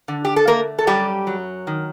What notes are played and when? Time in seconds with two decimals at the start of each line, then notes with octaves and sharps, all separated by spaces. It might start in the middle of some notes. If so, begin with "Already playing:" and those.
0.08 D3
0.25 G4
0.36 A4
0.48 A3 A#3 A#4
0.79 A4
0.87 F#2 G3 G4
1.27 F#3
1.67 D#3